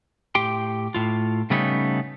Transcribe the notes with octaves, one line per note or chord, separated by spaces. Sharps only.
A2 G4 G5 C6
A2 F4
C#3 G3 A3 B3 C#4 D#4